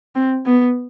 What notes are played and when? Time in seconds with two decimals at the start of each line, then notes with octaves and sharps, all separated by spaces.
0.15 C4
0.46 B3